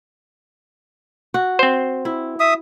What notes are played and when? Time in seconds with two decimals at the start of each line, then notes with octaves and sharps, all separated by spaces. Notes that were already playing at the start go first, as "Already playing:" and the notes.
1.34 F#4
1.59 C4 C5
2.05 E4
2.40 E5 D#6